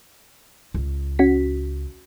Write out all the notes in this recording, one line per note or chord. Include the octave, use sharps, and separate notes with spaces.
C#2
C#4 F#4 B6